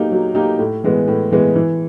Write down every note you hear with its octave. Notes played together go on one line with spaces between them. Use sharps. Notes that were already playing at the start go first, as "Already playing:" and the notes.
Already playing: F#3 A#3 D#4 G4
F#3
A#3 D#4 G4
A2
E3 G#3 B3
A2
E3 G#3 B3
E3